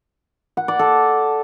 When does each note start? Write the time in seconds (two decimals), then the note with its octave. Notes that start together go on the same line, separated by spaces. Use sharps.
0.57 F#5
0.68 D5
0.79 A4